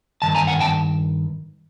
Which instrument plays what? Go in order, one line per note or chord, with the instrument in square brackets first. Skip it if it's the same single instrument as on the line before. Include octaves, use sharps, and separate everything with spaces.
[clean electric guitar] G2 D#3 A5
G#5 A#5
F#5 G#5
G5 A5